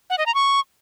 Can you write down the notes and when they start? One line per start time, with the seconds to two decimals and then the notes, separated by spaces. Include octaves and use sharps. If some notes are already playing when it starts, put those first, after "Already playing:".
0.10 F#5
0.18 D#5
0.26 A#5
0.34 C#6